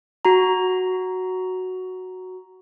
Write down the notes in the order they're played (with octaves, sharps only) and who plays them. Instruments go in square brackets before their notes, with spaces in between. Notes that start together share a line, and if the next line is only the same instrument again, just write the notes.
[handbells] F#4 A#5